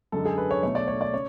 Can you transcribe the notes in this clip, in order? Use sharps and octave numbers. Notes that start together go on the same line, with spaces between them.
F#2 D3 G#3 A4
G#4
B4
C#5
B1 B2 A3 C#5
D5
C#5
D5
C#3 C#5